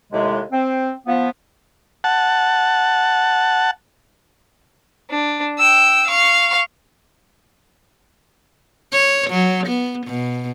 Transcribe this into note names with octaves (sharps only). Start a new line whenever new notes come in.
D#2 A2 C3 G#3
C4
F3 B3
F#5 A5
D4
G5 E6
F5 C#6
C#5
F#3
B3
B2